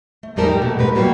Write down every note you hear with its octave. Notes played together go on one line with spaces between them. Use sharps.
A3
E2 G#2 G3 D#4 A#4 A5
G4
B2 A3 F#4
G#2 A#4 B4
F#3 G3 A#3 F#4 G4